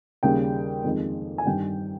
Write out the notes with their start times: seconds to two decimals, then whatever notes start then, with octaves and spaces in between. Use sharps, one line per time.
0.23 D#2 C#3 G3 G5
0.84 F2 D#3 G#3
1.38 G#5
1.45 G2 D#3 G3 G5